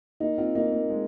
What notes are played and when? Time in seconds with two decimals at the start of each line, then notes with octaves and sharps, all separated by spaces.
0.20 A#3 D#4
0.38 C4 F4
0.55 A#3 D#4
0.72 A#3
0.90 G#3